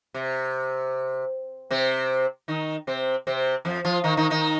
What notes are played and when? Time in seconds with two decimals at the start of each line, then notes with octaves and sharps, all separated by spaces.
0.14 C3
1.71 C3 C4
2.48 D#3 D#4
2.87 C3 C4
3.27 C3 C4
3.65 F2 F3
3.85 F3 F4
4.04 D#3 D#4
4.17 D#3 D#4
4.30 D#3 D#4